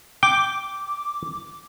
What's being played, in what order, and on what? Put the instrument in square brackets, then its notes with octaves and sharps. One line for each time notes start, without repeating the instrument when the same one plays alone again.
[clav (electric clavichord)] G5 [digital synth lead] D6